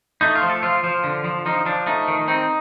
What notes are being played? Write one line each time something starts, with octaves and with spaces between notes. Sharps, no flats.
A3 D#4
F4
F3
A4
F3 F4
F3
D3
F3
F3 D#4
F3 D4
A3 D#4
D#3
C4 D#4